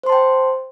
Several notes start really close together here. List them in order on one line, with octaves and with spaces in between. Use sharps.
C5 C6 A5 G5